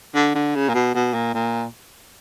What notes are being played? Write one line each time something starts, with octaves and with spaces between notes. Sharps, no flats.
D3
D3
C#3
A#2
B2
B2
A#2
A#2